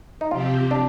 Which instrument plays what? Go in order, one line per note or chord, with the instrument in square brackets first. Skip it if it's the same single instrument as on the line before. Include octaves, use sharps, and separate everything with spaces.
[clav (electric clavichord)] D#4
[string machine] C3 F3 C4 G4 [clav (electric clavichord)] F4
[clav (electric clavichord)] D4